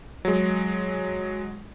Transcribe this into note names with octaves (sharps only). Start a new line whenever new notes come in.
F#3 G#3